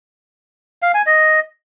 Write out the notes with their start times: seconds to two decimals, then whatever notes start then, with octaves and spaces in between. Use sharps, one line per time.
0.82 F5
0.94 G#5
1.06 D#5